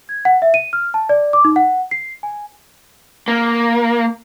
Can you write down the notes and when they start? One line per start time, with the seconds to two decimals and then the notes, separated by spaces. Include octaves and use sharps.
0.09 G#6
0.25 F#5
0.42 E5
0.54 D#7
0.73 F6
0.94 A5
1.09 D5
1.33 D6
1.45 D#4
1.56 F#5
1.91 C7
2.23 G#5
3.28 A#3